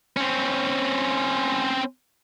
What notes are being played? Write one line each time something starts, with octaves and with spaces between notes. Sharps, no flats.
C4 C#4